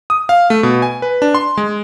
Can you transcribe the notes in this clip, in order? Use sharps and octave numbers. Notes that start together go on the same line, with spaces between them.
D#6
F5
A3
B2
G#5
B4
D4
C6
G#3